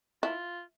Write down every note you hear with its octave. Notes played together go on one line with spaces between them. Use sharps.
E4 F4